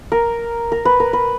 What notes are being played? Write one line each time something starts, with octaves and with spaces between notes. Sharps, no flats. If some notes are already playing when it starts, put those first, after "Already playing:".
A#4
A#4
B4
A#4
B4